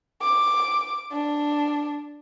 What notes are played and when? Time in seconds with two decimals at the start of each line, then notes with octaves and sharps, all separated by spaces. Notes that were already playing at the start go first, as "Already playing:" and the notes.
0.22 D6
1.12 D4